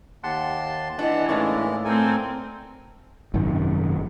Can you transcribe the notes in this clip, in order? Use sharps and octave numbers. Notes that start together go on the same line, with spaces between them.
D#2 G4 F#5 A5 C6
E3 D4 D#5 F#5 A5
A2 G#3 A#3 C#4 D#4 E4 D5 A5
A3 C4 A4 A#4 G#5
G#1 F#2 C3 D#3